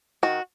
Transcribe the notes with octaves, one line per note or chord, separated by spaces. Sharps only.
D#3 F#4